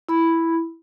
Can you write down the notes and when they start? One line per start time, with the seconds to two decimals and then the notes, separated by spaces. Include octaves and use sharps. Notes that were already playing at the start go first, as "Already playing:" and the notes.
0.09 E4 B5